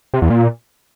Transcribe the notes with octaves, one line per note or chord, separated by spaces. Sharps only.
C3
E2
A#2